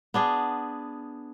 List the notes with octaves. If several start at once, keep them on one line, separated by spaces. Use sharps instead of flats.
B3 D4 G#4